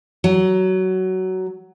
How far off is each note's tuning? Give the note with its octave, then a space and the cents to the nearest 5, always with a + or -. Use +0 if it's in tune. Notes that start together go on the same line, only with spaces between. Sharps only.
F#3 +15